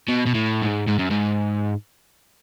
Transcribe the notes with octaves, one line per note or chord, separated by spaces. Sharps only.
B2
B2
A2
G#2
G#2
F#2
G#2